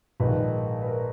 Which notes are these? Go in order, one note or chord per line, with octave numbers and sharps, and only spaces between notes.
A#1 G#2 D#3 B4
B4
A#4